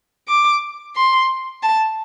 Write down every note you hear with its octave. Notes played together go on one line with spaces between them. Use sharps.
D6
C6
A5